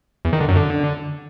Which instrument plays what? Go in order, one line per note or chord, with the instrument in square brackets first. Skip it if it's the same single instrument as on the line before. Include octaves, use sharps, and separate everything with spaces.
[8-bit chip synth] E2
D#3
D3
F#2
D3